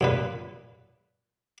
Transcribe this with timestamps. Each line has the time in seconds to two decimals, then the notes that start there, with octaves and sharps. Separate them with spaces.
0.01 F#2 A#2 B4